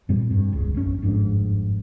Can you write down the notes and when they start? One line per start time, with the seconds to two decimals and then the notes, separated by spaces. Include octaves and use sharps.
0.09 F2 A#2 G3 C4
0.31 G2
0.52 E1 C#2 C#3
0.74 A1 F#2 C#3 C#4
1.02 G1 F2 G#2 D4